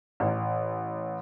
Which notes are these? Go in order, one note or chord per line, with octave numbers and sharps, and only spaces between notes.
A1